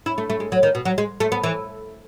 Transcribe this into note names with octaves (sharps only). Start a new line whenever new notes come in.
E4
A3
A3
G#3
F#3
D#3
B2
F#3
G#3
A3
B3
E3